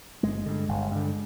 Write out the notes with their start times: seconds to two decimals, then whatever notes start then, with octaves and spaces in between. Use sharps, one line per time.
0.23 G1 G#3
0.46 G2 D3
0.68 G1
0.91 G2 D3